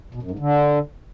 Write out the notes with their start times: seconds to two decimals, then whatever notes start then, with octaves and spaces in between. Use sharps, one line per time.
0.15 B2
0.23 F#2
0.31 G#2
0.39 D3